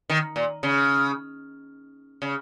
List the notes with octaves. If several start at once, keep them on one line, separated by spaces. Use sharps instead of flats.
D#3
A#2
C#3
C#3